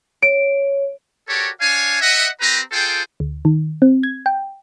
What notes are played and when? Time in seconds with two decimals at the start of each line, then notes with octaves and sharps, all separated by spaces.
0.22 C#5 D7
1.28 F#4 G4 A4 A#4 C#5 D5
1.61 D4 C#5 F5 G#5
2.01 D#5 E5 F#5
2.41 C4 G4 B4 A#5
2.72 F4 G#4 A4 C5 G5
3.20 D2
3.45 D#3
3.82 C4
4.03 G#6
4.26 G5